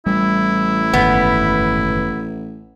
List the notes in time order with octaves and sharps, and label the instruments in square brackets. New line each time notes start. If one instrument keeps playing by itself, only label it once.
[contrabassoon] A1 [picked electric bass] G3 [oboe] E4
[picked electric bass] F#1 G#2 D#3 [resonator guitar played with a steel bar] B3